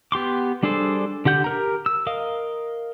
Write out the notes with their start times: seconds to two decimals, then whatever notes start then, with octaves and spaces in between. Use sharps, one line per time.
0.12 B3 G4 C6 D6
0.63 G3 D4 G#4 A4 C5
1.25 D3 G4 F#5 G6
1.44 G4 A#4 A#5
1.86 E6
2.07 A#4 D#5 F5 D#6